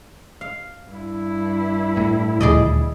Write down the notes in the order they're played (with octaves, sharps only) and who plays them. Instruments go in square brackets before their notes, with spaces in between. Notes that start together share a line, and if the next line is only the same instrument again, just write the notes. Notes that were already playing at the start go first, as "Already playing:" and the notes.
[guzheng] F5
[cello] G2 E4
[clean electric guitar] A2
[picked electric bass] D#1 D2 F3 [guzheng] G#4 D5 D#5